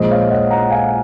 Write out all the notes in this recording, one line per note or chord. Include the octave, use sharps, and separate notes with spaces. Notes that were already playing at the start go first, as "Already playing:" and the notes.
Already playing: A#1 A#2 F3 G#3 C5 D#5
C#5 F5
D#5 F#5
F#5 A#5
F5 G#5